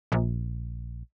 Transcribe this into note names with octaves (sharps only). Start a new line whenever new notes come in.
A#1